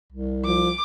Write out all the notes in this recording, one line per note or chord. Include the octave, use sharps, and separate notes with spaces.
C2
F3 D6